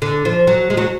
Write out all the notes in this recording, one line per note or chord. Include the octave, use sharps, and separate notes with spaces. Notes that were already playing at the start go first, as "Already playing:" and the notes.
D3
F3
F#3
G#3
F#3